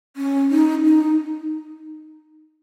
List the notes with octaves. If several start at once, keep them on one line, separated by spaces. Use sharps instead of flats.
C#4
D#4
D#4